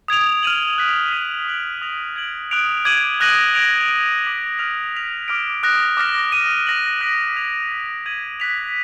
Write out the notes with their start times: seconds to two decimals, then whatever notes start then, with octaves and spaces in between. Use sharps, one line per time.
0.08 D#6 G#6 D7 F7
0.43 F6 G#6 D#7 F#7
0.78 F#6 B6 D7
1.12 F#6 B6 D#7
1.47 D#6 F#6 D7 F#7
1.82 D#6 A#6 F7
2.16 G#6 D7 F#7
2.51 D#6 F#6 D7 F7
2.85 D6 G#6 D#7 F#7
3.20 D#6 F#6 A#6 D#7 F#7
3.55 G#6 D7 F7
3.90 F#6 D7 F7
4.24 D6 F6 B6 D#7 F#7
4.58 F6 B6 D7 F7
4.93 G#6 B6 F7
5.28 D6 F6 A#6 D7
5.63 D#6 F#6 A#6
5.97 D6 F6 A#6
6.32 D#6 A#6 D#7
6.67 F6 A#6 D#7 F#7
7.01 D#6 F#6 B6 D7 F#7
7.35 F6 G#6 B6 F7
7.71 F#6 A#6 D#7
8.06 G#6 D#7 F#7
8.40 F#6 B6 F7